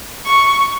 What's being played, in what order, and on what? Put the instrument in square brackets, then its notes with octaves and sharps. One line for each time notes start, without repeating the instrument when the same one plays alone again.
[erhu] C#6